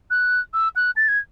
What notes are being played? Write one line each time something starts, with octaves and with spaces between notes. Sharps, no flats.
F#6
E6
F#6
A6
G#6